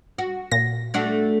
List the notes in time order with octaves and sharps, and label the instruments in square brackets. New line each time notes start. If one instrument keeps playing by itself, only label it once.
[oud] F#4
[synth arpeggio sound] A#2 A#6
[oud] A3 D4 F#4